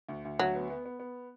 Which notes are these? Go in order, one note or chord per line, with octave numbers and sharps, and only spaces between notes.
D2
D2
D2 F#3
B3
B3
B3
B3